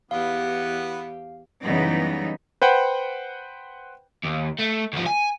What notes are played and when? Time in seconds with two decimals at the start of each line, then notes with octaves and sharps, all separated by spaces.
0.11 E2 E3 B3 G4 F5 F#5
1.62 F#2 C#3 E3 G3 B3 D#4
2.62 B4 C5 F#5 G5
4.24 D#2
4.59 A3
4.93 D2 F3
5.06 G#5